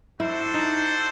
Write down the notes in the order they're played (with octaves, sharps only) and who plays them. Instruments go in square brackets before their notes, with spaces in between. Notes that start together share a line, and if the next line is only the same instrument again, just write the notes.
[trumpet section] D4 F#4 A4 C5 [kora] E4
[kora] D#4